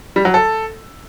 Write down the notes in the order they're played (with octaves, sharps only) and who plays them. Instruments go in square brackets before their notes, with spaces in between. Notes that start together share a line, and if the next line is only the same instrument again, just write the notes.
[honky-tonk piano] G3
F#3
A4